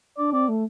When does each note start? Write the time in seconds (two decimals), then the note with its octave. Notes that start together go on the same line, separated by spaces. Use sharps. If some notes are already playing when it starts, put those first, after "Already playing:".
0.17 D4 D5
0.32 C4 D5
0.48 A3